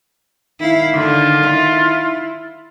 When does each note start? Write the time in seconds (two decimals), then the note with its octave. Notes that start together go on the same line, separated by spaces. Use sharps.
0.60 D#3 E4 F5
0.94 D3 F4
1.45 E4